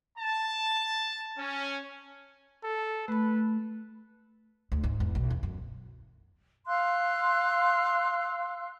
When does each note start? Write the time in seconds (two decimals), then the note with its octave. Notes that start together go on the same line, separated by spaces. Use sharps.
0.18 A5
1.38 C#4
2.64 A4
3.08 A3 B4 B5
4.72 D2
4.83 G#2
5.00 E2
5.15 B1
5.30 E2
5.43 F#2
6.68 F5 C6 E6 F#6